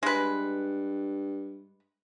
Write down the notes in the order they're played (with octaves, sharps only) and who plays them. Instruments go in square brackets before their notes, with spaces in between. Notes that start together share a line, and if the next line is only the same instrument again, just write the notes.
[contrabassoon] G2 [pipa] G#3 B4